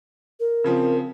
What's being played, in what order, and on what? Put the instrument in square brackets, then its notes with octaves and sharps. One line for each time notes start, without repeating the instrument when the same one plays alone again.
[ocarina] A#4
[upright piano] C#3 F3 C4